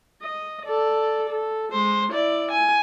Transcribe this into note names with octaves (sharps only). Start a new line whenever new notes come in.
D#5
A4 D5
A4
G#3 C5
E4 D5
G#5